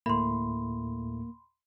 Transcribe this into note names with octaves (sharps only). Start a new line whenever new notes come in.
D2 A2 A3 A#3 B5 C6